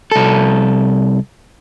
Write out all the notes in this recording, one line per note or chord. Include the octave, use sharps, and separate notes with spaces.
C2 A4